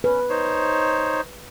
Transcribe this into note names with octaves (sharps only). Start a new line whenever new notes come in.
C#4 B4
D#4 C5 C#5